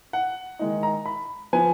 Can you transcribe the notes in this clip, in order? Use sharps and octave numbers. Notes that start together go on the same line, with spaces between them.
F#5
D#3 G#3 D#4
A#5
B5
F3 B3 G#5